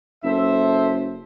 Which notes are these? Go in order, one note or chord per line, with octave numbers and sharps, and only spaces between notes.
F#1 A4 C5 E5